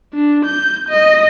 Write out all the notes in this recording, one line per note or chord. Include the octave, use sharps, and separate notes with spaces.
D4
G6
D#5